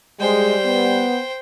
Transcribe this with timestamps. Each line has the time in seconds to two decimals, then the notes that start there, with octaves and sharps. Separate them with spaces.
0.20 G3 G#3 C5 G5
0.65 B3